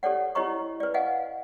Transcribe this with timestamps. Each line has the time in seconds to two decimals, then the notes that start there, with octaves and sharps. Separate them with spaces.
0.03 G4 A4 C#5 D5 F#5
0.35 E4 G4 C#5 D#5 A#5 C#6
0.80 B4 D5
0.94 D#5 F5 F#5 G#5